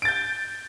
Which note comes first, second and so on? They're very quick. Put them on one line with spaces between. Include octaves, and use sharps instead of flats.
D7 A6 G6